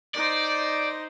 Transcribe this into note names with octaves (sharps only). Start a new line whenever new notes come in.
D#4 C5 D5